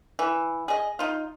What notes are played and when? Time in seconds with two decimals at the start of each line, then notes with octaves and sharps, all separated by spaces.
0.19 E3
0.68 G#4 D#5
0.99 D#4 F4